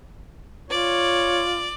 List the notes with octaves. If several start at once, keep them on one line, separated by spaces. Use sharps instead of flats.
F4 C#5 D5